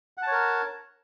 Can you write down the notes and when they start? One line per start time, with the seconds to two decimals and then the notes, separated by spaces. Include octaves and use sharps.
0.18 F#5
0.22 A5
0.27 C#5
0.32 A#4